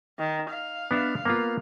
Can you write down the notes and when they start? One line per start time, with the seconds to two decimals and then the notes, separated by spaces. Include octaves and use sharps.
0.19 D#3
0.50 F5
0.91 B3 D4 E5
1.25 A#3 B3 F4